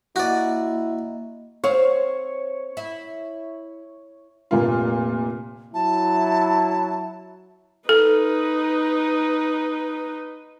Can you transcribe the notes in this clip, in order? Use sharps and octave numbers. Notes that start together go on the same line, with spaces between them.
A#3 E4 F#4 D5 D#5
C4 C#5 F5
E4
F1 A#2 A#3 F4
F#3 E4 A5
D#4 A4 B4